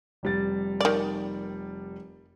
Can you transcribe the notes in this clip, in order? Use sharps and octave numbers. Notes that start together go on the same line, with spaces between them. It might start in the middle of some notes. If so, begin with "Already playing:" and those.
F1 G3 A6
D#3 D5